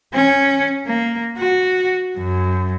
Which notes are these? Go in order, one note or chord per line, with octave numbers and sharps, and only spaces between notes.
C#4
A#3
F#4
F#2